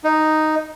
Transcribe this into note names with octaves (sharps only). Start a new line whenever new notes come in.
D#4